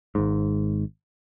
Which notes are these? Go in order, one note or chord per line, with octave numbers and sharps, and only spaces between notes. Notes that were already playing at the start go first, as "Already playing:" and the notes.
G#1 G#2